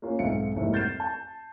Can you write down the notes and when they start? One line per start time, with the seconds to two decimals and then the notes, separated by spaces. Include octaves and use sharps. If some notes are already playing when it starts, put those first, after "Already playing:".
0.02 A#3 C#4 F4
0.19 B1 G#2 C4 E5 F5 C#7
0.56 F1 C2 G#2 A#3 C5 E5
0.73 F6 G6 A6 C7 E7
1.00 A5